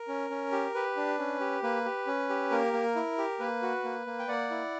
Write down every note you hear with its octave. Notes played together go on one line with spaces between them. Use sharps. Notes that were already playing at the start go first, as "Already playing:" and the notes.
Already playing: A#4
C#4
C#4
G4
G4 B4
D4
C#4
G4
A#3 B4
G4
C#4
G4
A#3 A#4
A#3
E4
G4
A#3 B4
F#4
A#3
A#3
G5
A#3 D5 F#5
E4